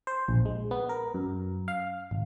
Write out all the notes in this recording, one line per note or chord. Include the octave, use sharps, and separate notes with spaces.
C5
A#1
G#3
B3
A#4
F#2
F5
G#1